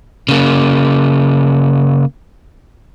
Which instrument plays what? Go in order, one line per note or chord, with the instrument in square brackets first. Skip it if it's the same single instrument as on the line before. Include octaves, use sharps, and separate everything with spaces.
[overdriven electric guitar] C#3 A#3